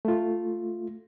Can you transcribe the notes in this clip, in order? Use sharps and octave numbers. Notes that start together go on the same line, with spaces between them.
A3 F4